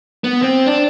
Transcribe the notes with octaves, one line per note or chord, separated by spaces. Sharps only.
B3
C4
D4